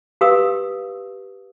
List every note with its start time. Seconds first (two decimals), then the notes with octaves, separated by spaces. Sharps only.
0.21 G4 B4 F5 D#6 E6